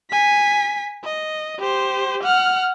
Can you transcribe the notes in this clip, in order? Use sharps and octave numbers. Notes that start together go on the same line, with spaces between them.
G#5 B6
D#5
G4 C5
F#5 F6